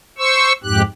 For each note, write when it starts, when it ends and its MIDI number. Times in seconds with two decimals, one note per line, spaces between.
0.18 0.53 72
0.18 0.53 85
0.18 0.53 88
0.64 0.82 41
0.64 0.82 44
0.64 0.82 67
0.64 0.82 90